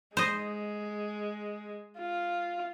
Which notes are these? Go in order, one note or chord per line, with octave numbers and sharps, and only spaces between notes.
G#3 C5 D#5
F4